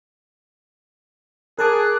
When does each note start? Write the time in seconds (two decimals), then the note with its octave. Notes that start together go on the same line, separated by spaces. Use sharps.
1.59 G#4 A#4 A5 D6 F#6